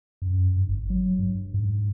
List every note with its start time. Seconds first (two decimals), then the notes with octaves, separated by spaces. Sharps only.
0.22 F#2
0.57 G2
0.69 G1
0.90 F#3
1.19 G2
1.54 G#2